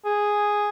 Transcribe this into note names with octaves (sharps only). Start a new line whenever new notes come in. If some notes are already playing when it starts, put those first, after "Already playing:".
G#4